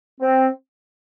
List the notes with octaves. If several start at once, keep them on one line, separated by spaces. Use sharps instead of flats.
C4